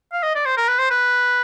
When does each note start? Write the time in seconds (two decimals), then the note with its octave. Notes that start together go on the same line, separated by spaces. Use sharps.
0.13 F5
0.23 D#5
0.36 D5
0.46 C5
0.57 A#4
0.68 B4
0.79 C5
0.91 B4